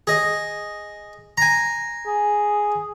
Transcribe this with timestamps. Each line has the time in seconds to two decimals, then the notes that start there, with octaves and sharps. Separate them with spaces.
0.07 G#4 D#5
1.38 G#5 A#5
2.06 G#4